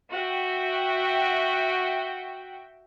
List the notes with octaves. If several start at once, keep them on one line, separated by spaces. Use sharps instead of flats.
F#4 E5 G5